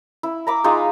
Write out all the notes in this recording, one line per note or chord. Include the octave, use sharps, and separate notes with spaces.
E4
A#5 B5 D6
G#3 D#4 F4